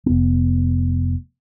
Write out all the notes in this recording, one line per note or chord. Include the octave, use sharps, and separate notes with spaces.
F1 B3